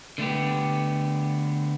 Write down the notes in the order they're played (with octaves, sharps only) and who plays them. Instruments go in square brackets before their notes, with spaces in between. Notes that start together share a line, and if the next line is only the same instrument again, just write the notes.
[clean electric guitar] D3 A3 B3 G4